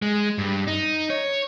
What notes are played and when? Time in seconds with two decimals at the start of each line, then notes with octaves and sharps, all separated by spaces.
0.02 G#3
0.38 G2
0.67 D#4
1.10 C#5